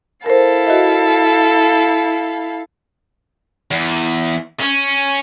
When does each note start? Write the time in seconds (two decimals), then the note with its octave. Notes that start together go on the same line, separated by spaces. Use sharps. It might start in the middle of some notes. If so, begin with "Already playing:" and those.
0.26 E4 A4 A#4 C5 F5
0.67 F#4 D#5 E5
3.71 E2
4.61 C#4